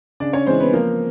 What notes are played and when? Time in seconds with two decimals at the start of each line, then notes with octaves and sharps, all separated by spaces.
0.20 C#3 D4 D5
0.33 C#4 C#5
0.46 E3 G#3 C4 C5
0.60 B3 B4
0.73 F3 A#3 A#4